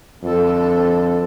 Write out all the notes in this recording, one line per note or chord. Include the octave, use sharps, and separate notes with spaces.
F2 D3 A4